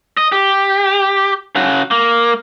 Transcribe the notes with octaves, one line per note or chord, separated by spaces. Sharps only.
D#5
G4
C#3 F#4
A#3